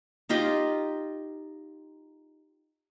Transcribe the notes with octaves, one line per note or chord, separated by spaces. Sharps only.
D#4 F4 G4 D#5